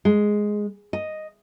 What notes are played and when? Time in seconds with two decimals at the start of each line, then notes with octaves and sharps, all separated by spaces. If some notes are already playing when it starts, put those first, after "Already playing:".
0.05 G#3
0.93 D#5